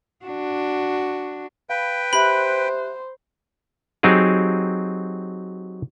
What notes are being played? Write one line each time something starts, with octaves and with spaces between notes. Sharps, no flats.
D4 F#4
B4 F5 G5 B5
G4 C5 E5 B5 F#6
F#3 C4 D#4 G4 G#4